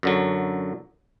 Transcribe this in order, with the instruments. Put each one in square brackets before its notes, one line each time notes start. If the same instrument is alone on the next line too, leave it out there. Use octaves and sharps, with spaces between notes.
[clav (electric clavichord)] F#2 D3 F#3